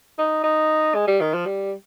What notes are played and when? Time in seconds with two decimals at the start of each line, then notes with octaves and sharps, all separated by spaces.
0.19 D#4
0.44 D#4
0.95 G#3
1.07 G3
1.21 D#3
1.34 F3
1.46 G3